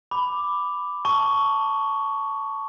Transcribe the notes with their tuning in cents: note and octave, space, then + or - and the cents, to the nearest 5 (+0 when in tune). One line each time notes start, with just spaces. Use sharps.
B5 +10 D6 +0
A5 +5 C#6 +10